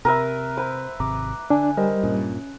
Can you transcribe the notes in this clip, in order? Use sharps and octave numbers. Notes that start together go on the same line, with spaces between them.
C3 A#4 B4 E5
B4 C5
G#1 C3 A#5 D6
D3 D4 G#5
G3 A#4 C5 D#5
G2 A#2 C#4